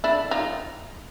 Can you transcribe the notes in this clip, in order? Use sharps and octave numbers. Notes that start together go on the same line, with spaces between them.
D4 E4
D#4 F4